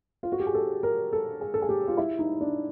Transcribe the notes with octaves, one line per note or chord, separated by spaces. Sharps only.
F4
F#4
G4
G#4
A4
A#4
A4
G#4
A4
G#4
G4
F4
E4
D#4
D4